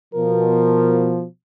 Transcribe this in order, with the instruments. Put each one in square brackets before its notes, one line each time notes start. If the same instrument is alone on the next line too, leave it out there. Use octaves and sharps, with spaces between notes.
[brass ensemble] B2 F3 [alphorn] A#4